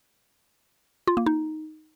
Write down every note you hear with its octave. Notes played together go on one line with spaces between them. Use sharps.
F4
A#3
D#4